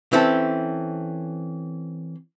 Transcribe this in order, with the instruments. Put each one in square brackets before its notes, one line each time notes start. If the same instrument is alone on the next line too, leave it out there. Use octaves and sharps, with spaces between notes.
[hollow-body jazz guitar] E3 C4 C#4 A4